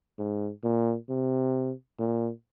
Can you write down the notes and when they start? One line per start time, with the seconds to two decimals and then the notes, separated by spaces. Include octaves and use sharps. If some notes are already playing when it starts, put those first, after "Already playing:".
0.19 G#2
0.64 A#2
1.10 C3
1.99 A#2